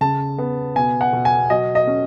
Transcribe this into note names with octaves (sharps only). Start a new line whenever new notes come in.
C#3 A5
B3
B2 G#5
F#5
B2
G#5
F#3 D#5
D#5
C#4